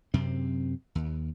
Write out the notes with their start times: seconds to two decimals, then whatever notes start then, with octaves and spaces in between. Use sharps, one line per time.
0.14 F#2 C3 C4
0.95 D#2